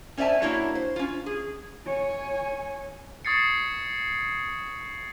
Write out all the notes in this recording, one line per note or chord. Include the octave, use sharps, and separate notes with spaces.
C#4 C5 D5 E5 G#5 A5
A#3 D4 E4 F#4 C#5
C5
C#4 F4
G#4
C#5 G#5
C#6 D#6 G#6 A6 C7 C#7